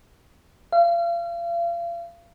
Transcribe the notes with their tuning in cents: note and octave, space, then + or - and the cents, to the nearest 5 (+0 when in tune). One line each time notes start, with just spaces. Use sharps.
F5 -35